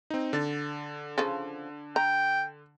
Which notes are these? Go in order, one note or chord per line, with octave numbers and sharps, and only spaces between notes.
C4 D#4
D3 A6
C#3 F3 A4
G5 A#5